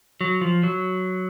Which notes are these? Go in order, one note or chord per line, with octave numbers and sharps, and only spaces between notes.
F#3
F3
F#3